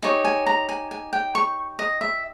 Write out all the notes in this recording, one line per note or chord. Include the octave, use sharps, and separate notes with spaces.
D#4 G4 C#5 G#5
G#5
A#5
G#5
G#5
G5
C#6
D#5
E5